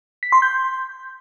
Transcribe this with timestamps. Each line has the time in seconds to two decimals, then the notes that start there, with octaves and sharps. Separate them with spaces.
0.23 B6
0.32 C6
0.42 G6